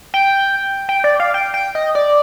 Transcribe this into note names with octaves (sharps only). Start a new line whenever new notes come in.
G5
G5
D5
F5
G5
G5
D#5
D5